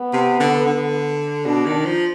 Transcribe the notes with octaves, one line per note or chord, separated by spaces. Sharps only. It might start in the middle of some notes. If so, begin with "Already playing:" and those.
Already playing: B3
C3
D3
D3
B2 D4
D#3
F3